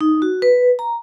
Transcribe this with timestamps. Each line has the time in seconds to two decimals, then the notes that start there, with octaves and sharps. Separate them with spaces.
0.01 D#4
0.22 F#4
0.42 B4
0.79 A#5